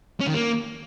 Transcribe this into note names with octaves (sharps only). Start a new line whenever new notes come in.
C#4
D#3
A#3